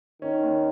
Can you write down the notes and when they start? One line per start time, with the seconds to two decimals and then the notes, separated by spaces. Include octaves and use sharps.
0.22 D#3 C#4
0.43 D#2